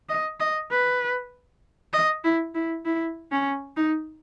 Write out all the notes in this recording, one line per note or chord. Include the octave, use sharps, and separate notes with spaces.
D#5
D#5
B4
D#5
E4
E4
E4
C#4
D#4